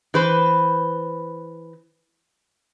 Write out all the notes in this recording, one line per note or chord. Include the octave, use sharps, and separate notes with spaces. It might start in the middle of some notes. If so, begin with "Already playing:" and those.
E3 B4 C5